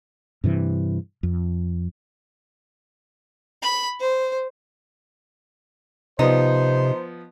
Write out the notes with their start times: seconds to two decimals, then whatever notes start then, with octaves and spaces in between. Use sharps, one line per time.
0.44 G2 C3 E3
1.23 F2
3.62 B5
3.99 C5
6.19 C3 F3 B3 D#4 C5